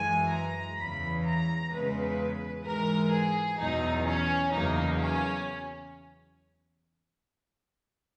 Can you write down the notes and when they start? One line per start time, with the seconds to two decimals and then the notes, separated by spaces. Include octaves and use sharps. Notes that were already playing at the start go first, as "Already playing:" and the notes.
Already playing: F#2 E3 G#3 G#5
0.33 A#5
0.79 E2 C#3 E3 B5
1.26 A#5
1.72 E2 C#3 G#3 B4
2.65 G#2 E3 G#3 A#4
3.13 G#4
3.59 E2 B2 F#3 D#4
4.05 C#4
4.53 E2 C#3 F#3 A#3 D#4
5.00 C#4